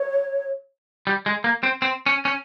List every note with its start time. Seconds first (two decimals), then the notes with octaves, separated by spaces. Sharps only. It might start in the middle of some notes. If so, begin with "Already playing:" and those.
Already playing: C#5
1.07 G3
1.26 G#3
1.44 A#3
1.63 C4
1.82 C4
2.06 C#4
2.25 C#4